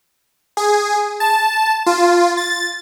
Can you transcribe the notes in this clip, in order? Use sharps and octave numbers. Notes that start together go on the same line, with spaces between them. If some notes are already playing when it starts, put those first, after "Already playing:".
G#4
A5
F4
A6